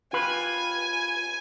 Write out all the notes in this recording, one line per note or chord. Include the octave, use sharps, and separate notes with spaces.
F4 G4 B4 G#5